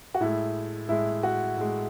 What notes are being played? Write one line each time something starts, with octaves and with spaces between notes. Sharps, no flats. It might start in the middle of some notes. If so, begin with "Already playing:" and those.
F#4
A2 G#3 E4
A2 G#3 E4
F#4
A2 G#3